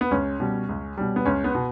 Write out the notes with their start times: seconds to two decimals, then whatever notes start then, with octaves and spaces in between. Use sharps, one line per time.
0.01 B3
0.11 C#2 C#4
0.40 B2 G3
0.69 C#2
0.97 B2 G3
1.16 B3
1.25 C#2 C#4
1.44 B3
1.55 B2